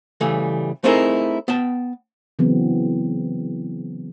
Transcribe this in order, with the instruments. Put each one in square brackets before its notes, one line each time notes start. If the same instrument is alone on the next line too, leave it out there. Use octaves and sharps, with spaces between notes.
[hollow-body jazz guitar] C#3 E3 G3 A3
A3 C4 D#4 E4 G#4 A#4
B3 G5 A5
[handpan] C#3 E3 F#3 B3 C4